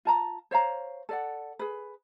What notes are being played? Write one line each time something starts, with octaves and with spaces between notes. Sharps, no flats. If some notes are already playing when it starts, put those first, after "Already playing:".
F4 A5 A#5
C5 C#5 F5 A#5
A4 D5 F#5
G#4 B4